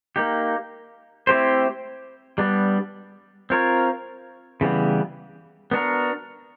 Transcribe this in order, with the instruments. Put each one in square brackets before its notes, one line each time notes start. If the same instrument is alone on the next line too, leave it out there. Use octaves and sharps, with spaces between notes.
[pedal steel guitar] A#3 D#4 G4
A3 C4 E4 G4 C5
G3 B3 D4
C4 F4 A#4 C#5
C#3 E3 G3 B3
B3 D4 F#4 A#4